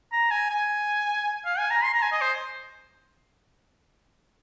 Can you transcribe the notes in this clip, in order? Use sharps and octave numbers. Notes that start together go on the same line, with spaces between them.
A#5
G#5
G#5
F5
G#5
A#5
C6
A#5
G#5
D#5
C5